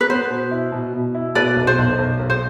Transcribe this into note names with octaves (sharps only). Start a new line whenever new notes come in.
B4
B3 C5
B2
E4
B2
B2
E4
B2 B4 D5
B1
C5
B1
B1
B1
C5